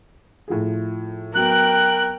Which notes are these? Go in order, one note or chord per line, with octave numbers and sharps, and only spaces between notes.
A2 F3 G#4
F#3 B3 A#4 G5 F#6